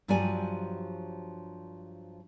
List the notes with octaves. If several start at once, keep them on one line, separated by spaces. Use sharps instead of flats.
G2 F3 F#3 G4 D5 G#5